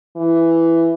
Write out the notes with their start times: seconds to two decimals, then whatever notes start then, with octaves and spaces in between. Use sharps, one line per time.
0.17 E3